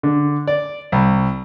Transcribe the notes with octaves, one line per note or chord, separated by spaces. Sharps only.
D3
D5
C2